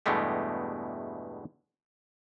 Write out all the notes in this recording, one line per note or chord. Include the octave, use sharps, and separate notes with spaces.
E2 G2 B2 G#3 A3 G4